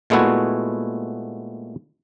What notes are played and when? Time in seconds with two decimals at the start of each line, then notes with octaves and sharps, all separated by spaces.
0.10 A#2 G#3 A3 B3 E4 F#4